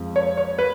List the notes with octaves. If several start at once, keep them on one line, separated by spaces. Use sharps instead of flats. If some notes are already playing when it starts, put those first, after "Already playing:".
Already playing: F2 F3 G#3
C#5
C#5
B4